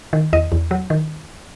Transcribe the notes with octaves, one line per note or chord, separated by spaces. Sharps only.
D#3
E2 D#5
E2
F#3
D#3